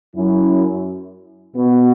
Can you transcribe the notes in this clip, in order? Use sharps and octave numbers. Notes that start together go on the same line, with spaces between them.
F#2 F#3 C#4 E4
B2 B3 F#4